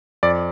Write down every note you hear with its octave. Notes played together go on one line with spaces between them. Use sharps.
F2 D5